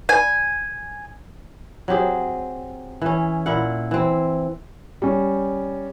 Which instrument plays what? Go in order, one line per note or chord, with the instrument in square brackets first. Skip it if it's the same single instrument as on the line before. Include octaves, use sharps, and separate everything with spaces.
[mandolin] G#5
[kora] F#3 C4 G4 G#4
E3 C#4
A#2 E4 F5 F#5
E3 C4
[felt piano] G3 C#4